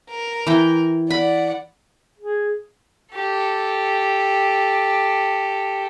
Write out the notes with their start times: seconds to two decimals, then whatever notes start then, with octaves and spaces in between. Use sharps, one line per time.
0.10 A#4
0.47 E3 G5
1.10 D5 F#5 B5
2.18 G#4
3.14 G4 A4